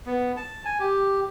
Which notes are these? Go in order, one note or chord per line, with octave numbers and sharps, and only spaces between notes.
B3
A5
G#5
G4